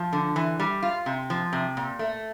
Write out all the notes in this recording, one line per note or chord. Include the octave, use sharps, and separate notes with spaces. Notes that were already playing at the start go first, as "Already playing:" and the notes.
Already playing: F3
D3
E3
G3
F4
C3
F3
C3
A#2
A3